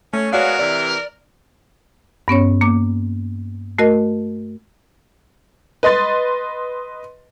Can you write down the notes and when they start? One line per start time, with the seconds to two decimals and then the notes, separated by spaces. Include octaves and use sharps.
0.13 A3 C#4
0.33 G#3 B3 F#4 A#4 C#5 D5 F5
0.59 C3 E3 D5
2.28 G2 B3 C#4 C#5
2.61 A#3 D6
3.79 A3 F#4 A#4 D#5
5.83 B4 D#5 C6 A6